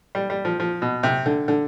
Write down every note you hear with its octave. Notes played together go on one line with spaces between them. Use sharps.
G3
G3
F3
F3
B2
C3
D3
D3